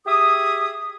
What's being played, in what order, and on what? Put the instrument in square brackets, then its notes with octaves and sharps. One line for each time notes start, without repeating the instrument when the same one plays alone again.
[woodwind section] G4 G#4 E5 D#6